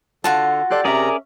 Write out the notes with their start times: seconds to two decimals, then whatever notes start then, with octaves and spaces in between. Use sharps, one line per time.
0.24 D3 F4 F#4 F#5 A5
0.70 G4 A4 D5 C6 F#6
0.85 C3 C#4 G#4 A#4 D5 E5 A#5